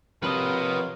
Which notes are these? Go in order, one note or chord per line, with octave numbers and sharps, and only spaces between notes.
F2 C3 F4 A#4 B4 C#5 D#5